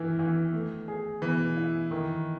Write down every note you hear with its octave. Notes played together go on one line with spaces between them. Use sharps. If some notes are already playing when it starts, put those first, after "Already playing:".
Already playing: D#3 E3 E4
E3
A3
G#4
B2 E3
E4
D#3